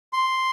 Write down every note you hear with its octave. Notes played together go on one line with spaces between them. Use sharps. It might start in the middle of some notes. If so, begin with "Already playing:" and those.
C6